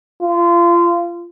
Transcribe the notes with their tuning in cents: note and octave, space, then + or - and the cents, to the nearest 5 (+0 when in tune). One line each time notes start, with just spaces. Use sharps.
F4 -25